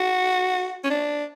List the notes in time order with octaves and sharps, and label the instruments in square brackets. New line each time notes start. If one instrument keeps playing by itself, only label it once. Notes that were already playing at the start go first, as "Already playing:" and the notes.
Already playing: [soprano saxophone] F#4
C#4
D4